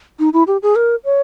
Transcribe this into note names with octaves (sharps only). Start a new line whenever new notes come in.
D#4
E4
G4
G#4
A#4
C#5